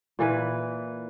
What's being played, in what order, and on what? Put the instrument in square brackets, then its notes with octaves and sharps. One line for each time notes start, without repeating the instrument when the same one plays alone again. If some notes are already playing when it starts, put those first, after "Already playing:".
[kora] A#2 E3 B4